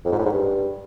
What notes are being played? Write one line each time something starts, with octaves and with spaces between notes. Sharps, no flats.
F2
G#2
A2
G#2
G2